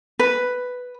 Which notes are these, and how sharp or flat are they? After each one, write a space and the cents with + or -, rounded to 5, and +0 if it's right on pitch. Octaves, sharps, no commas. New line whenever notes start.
B4 +5